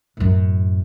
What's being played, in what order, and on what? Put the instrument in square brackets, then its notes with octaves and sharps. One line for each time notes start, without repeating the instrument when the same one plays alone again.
[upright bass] F#2 A2